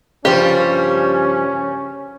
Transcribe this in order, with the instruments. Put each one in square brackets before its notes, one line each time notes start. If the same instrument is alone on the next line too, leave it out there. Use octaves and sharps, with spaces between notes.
[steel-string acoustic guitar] G2 F3 [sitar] C#3 G3 A#3 [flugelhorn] C#4 [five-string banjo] G4